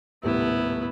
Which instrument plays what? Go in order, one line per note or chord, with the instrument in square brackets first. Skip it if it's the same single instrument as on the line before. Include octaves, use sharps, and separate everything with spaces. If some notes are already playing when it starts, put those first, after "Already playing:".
[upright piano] D#1 A2 C3 [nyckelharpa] B3 E4